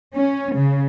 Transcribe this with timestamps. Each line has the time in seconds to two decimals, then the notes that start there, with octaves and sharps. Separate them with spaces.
0.15 C#4
0.56 C#3